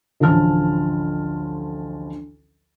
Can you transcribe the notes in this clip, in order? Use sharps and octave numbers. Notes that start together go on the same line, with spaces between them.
A1 D2 F3 C#4 A5 F6